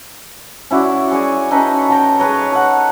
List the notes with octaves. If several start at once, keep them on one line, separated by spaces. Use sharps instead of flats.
C#4 E4 F#4 D5
G#4 C#5 D5 G#5
C#4 D#4 A4 B4
A4 G5 A#5
G#4 B4 C#5
A4 F#5